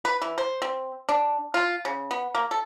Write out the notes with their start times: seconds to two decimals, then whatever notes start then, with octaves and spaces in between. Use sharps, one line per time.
0.05 B4
0.22 E3
0.38 C5
0.62 C4
1.09 D4
1.54 F4
1.85 C#3
2.11 B3
2.35 A#3
2.51 A4